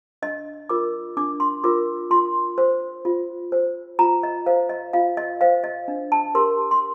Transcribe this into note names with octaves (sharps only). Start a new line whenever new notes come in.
D4 D#5
F4 A#4 D6
D4 D6
C6
F4 A#4 D6
F4 C6
C5
F4
C5
F4 A#5
D#5
C5 F5
D#5
F4 F5
D#5
C5 F5
D#5
D4
A5
G4 A#4 C6
C6